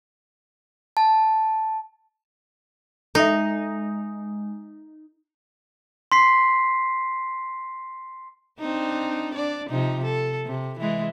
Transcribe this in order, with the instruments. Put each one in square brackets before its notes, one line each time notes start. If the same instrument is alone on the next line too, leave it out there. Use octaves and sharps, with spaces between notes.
[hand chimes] A5
[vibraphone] G#3 [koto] D#4 [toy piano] A4 E5
[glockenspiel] C6 B6 C7
[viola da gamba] C4 D4 D#4
D4 D5
C3 F3 D#4
A4
C3
E3 G#3